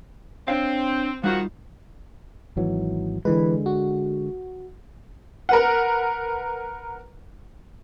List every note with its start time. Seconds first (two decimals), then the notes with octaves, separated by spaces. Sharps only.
0.48 C4 D4 C#5 F5
1.24 D#3 F3 G3 D#4 F4 F#4
2.57 G#1 E3 F#3
3.25 D3 E3 G#3 B4
3.66 F#4
5.49 A#4 B4 F#5